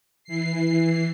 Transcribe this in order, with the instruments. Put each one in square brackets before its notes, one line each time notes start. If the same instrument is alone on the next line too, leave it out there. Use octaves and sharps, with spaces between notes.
[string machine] E3 C7